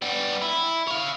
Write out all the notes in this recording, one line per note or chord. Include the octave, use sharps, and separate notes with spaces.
G3 B3
E4
C#5 F5